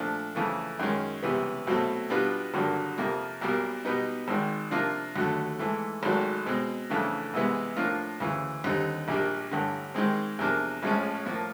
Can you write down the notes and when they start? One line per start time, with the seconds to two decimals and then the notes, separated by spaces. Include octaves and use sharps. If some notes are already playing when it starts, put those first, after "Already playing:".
Already playing: A#2 F3 A3 D4
0.35 F2 C#3 E3 A3
0.79 F#2 D#3 G#3 C#4
1.23 C#2 C3 E3 G3 B3
1.67 C2 B2 F#3 A3 C4
2.10 B2 G3 B3 D4 F4
2.54 G#1 G2 D3 F#3 A#3
2.98 F2 C3 F3 A#3
3.41 B1 B2 G3 A#3
3.85 B2 G3 B3 D#4
4.28 G#1 G#2 D#3
4.71 C3 F3 A#3 D4 F4
5.16 D#2 D3 F#3 A3
5.59 G#2 E3 A3
6.03 G#1 G#2 D#3 F#3 A3
6.46 B2 G#3 C4
6.90 F2 C#3 E3 A3 D4
7.33 C2 C3 E3 G#3 B3
7.76 A2 F3 A#3 D4 F4
8.20 D2 C#3 E3
8.64 D#2 D3 G3 C4 D#4
9.08 A#1 A#2 G3 A#3 D4
9.51 A1 G2 D3
9.95 G#2 D#3 G#3 C4
10.39 E2 C3 F3 A#3 D4
10.83 A#1 A2 F3 G#3 C#4
11.26 A2 F3 A#3